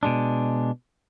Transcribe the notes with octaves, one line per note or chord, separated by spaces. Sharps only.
B2 G#3 D4